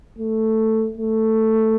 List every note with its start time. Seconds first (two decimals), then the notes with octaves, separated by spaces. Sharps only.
0.19 A3
0.98 A3